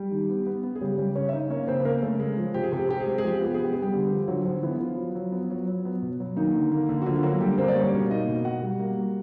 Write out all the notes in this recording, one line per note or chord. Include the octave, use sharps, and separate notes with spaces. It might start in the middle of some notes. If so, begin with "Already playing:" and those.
Already playing: G3 G4
D#3
B3
B3
B3
G#4
C#3 G3 G4
C#3 G3 G4
C#3 C#4 C#5
E5
C#3 D#4 D#5
A#3 C#4 C#5
C#3 C4 C5
B4
A#3 A#4
C#3 A3 A4
G#3
F3
C3 G4
G#4
C3 G4
G#4
C3 G4
G#4
G#3 G4
G#4
F3 G4
G#4
B3 G4
G#4
B3
G4
B3 G#4
G3 G4
D3
F3
D3 F#3 F#4
D3 F3 F4
E3 B3 E4
F3 B3 F4
F#3
F#3
B3
F#3
F#3
B3
B2
F#3
D#3 A#3 D#4
D3
A#3
D3
F#4
D3 F3 F4
F4
F#3 A#3 F#4
D3 G3 G4
A#3 C4 C5
D5
G3 C#4 C#5
B2
A#3 D#4 D#5
B2
B2 F#4 F#5
G3
A#3
G3